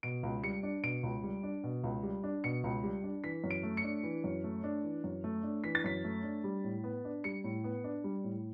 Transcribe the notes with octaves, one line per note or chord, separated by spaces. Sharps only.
B2 D7
C#2
G3 C#7
D4
B2 D7
C#2
G3
D4
B2
C#2
G3
D4
B2 C#7
C#2
G3
D4
E3 B6
F#2
D7
A3
C#7
D4
E3
F#2
A3
D4
E3
F#2
A3
D4
E3 B6
A6
F#2 B6
A3
D4
G3
A2
B3
D4
G3 C#7
A2
B3
D4
G3
A2